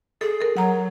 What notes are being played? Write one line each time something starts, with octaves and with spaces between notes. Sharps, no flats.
G#4 A4
A4 A#4
F#3 F#5 A#5